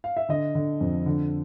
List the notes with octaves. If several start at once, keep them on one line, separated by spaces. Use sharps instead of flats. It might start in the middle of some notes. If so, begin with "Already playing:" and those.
F5
E5
D3 D#5
D3
F2
D3